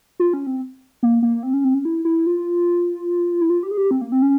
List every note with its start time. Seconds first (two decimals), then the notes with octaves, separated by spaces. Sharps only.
0.20 F4
0.33 C#4
0.47 C4
1.03 A#3
1.22 A#3
1.43 C4
1.53 C#4
1.64 C4
1.74 C#4
1.85 E4
2.05 E4
2.26 F4
3.41 E4
3.50 F4
3.63 G4
3.71 G#4
3.77 G4
3.91 C4
4.01 A#3
4.12 C4
4.22 C#4